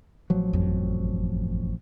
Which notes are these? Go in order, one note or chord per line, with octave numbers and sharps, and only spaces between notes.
A1 F3 F#3
G1 F2